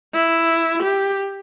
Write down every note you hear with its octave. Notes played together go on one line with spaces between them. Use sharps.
E4
G4